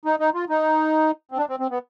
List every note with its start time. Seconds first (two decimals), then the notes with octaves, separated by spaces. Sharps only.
0.05 D#4
0.20 D#4
0.34 F4
0.49 D#4
1.32 C4
1.38 D4
1.49 C4
1.60 C4
1.71 B3